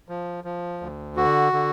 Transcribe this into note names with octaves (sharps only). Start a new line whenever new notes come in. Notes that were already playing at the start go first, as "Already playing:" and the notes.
F3
F3
D2
D3 F#4
D3